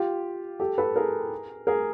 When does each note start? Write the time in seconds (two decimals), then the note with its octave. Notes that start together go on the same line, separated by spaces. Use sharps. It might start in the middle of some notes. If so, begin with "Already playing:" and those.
Already playing: F4 G4
0.60 G4 A4
0.78 A4 B4
0.96 G#4 A#4
1.67 G#4 A#4